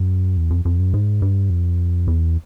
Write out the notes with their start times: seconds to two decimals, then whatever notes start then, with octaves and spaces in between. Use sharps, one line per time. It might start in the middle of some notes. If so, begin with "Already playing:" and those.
Already playing: F#2
0.37 E2
0.50 F2
0.65 F2
0.80 F#2
0.94 G#2
1.22 G2
1.50 F2
2.07 E2